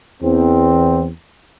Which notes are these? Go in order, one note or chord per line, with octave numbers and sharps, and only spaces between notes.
E2 C4